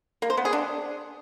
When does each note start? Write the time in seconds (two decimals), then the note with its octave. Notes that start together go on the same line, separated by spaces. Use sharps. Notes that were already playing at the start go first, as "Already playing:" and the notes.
0.22 A#3
0.30 C5
0.37 B3
0.45 G#4
0.53 D4